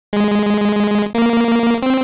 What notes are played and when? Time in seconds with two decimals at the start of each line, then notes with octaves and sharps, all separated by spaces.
0.13 G#3
1.15 A#3
1.83 C4